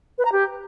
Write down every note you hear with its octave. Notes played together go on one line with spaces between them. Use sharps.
B4
A#5
G4